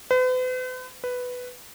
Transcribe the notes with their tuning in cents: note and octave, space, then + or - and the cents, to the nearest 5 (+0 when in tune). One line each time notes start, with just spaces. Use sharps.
B4 +45
B4 +5